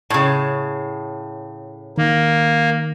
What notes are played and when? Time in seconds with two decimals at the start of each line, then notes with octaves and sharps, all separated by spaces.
0.10 A2 C#3
1.98 D#3 A#3